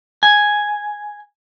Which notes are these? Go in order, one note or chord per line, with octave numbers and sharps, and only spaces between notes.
G#5